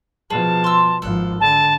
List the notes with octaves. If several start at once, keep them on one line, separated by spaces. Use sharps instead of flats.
B2 F3 G#4 A5
C6 E6
G#1 F3 A4 F#6
D3 A5